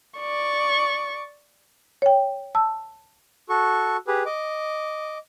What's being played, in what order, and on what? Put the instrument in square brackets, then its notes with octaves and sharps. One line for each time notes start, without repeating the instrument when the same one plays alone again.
[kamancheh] D5 C#6
[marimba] C#5 G5
A5 E6
[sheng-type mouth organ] F#4 A4 C#6
G4 G#4 B4
D#5 D6